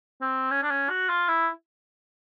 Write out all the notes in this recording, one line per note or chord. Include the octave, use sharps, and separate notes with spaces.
C4
C#4
D4
C#4
F#4
F4
E4